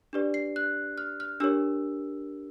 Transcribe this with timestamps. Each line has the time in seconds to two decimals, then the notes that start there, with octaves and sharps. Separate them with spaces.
0.13 D4 G4 B4 D5
0.34 C7
0.56 F#6
0.98 F6
1.20 F6
1.40 D4 G4 A#4 C#5 E6